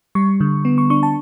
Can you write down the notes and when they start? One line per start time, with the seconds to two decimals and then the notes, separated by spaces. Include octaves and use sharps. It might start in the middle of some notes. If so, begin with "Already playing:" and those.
0.15 G3 C#6
0.40 D3
0.65 B3
0.78 C#6
0.90 D4 C#6
1.03 A5